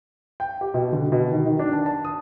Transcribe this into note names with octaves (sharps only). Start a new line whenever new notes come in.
G5
G4
B2
D3
B2
D#3
D#3
D4
A5
A5
D#6